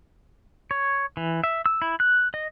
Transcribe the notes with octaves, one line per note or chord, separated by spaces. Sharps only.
C#5
E3
E5
E6
E4
F#6
D#5